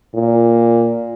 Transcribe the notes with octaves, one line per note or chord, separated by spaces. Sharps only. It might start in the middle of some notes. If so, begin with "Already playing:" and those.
A#2